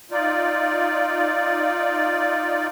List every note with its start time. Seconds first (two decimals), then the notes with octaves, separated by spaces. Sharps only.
0.11 D#4 F4 D5